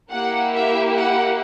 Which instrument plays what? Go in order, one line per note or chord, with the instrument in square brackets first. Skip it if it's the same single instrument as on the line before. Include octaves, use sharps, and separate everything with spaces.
[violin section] A#3 E4 G4 F#5
E5
F#5